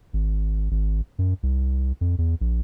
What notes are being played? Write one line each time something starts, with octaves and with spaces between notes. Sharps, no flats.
G#1
G#1
F#2
C2
F2
E2
A#1